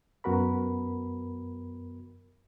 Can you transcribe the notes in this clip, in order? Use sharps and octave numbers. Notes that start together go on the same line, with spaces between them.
F#2 B3 F#4 A#4 B5